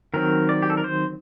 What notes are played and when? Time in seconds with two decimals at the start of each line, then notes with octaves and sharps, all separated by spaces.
0.14 D#3 F#3 C4 A#4
0.49 D5
0.62 G4
0.70 A4
0.77 A#4
0.84 C5